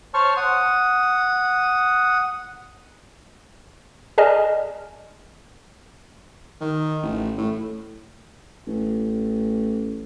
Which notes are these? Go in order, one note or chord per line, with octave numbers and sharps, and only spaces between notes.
C5 C#5 A5 C#6 F6
F#5 D#6
G#4 D5 D#5 G#5 A5 F6
D#3
A1
A2
A1